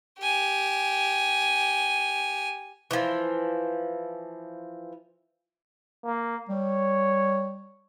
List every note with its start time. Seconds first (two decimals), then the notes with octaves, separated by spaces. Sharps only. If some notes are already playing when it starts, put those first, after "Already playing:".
0.19 G4 G#5
2.91 E3 F3
6.05 A#3
6.49 G3 C#5